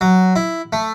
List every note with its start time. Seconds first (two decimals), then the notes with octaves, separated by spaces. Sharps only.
0.01 F#3
0.36 E4
0.73 A3